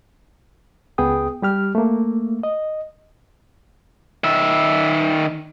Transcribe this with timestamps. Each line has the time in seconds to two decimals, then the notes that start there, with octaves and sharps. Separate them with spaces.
0.98 C#2 B3 G#4 G5 D#6
1.42 G3 G4 F6
1.75 A3 A#3
2.43 D#5
4.24 D#3 E5